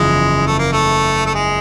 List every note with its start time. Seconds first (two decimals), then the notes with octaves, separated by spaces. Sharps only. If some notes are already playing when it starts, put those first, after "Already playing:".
Already playing: F#1 E2 C#3 F3 G#3
0.46 A3
0.59 A#3
0.72 A3
1.26 A3
1.34 G#3